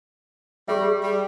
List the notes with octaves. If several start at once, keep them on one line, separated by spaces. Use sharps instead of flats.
G3 G4 G#4 E5
G3